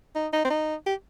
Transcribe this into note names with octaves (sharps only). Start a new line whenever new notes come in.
D#4
D#4
C4
D#4
G4